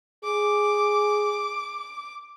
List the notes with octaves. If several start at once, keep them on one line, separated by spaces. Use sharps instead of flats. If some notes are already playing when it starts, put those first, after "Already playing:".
G#4 D6